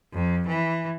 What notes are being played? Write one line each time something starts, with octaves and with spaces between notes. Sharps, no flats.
F2
E3